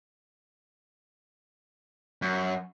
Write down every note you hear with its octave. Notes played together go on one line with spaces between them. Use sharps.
F#2